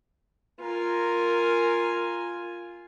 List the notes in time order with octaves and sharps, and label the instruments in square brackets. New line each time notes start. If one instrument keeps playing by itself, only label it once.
[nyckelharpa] F4 G#5 [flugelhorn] A#4